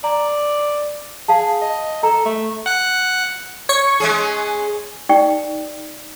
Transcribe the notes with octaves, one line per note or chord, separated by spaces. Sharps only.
D5 A#5
G#4 F5 A5
D#5
A4 A#5
A3
F#5 F#6
C#5 C#6
G#3 C#4 G#4
D#4 G4 D5 G5 C#6